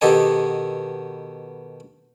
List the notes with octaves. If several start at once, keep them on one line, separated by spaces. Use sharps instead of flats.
B2 D#3 G4 A4 D#5 G#5